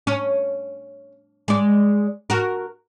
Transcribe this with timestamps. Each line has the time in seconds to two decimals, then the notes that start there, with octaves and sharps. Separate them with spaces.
0.07 C#4
1.48 G#3 D5
2.30 F#4 A#4